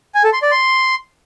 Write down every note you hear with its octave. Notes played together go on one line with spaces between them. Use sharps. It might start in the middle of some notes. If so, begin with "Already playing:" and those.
G#5
A4
C6
D5
C6